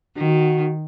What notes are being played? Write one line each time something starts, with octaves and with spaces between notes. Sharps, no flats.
D#3 F#4